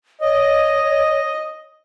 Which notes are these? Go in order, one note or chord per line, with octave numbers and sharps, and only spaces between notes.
C#5 D#5